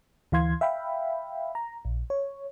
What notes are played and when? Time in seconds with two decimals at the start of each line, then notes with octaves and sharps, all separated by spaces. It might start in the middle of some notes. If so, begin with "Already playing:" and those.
0.32 D2 E3 F5 C6 G#6
0.61 E5 F5 G5 B5
1.55 A#5
1.85 A#1
2.10 C#5